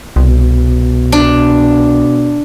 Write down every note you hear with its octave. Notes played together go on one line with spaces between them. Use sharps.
C2 B2
D4